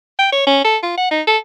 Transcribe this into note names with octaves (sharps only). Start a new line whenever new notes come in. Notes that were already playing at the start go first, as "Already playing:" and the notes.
G5
C#5
C#4
A4
F4
F#5
D#4
A4